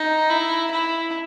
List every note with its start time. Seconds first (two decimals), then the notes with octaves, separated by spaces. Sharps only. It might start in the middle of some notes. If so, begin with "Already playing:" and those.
Already playing: D#4
0.30 E4
0.71 E4